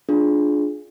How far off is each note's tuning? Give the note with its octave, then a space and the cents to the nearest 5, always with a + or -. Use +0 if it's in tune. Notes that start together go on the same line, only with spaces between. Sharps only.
D4 +0 F4 +0 G#4 +20